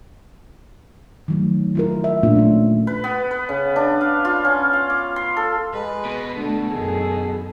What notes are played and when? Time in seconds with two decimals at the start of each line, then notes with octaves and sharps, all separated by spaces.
1.28 D#3 F#3 A3
1.75 E4 F4 A#4
2.04 E5
2.23 A#2 A3 A#3 D4 F4
2.35 A3 A#3 C#4
2.87 B4
3.04 B3
3.31 B4
3.49 C#3
3.76 D4
4.01 F5
4.25 F4
4.45 C#4
4.73 F5
4.90 D6
5.16 C6
5.36 A4
5.73 G#3 B4
6.05 B2
6.36 D3 A3 A4
6.71 F#2 D#3 G#4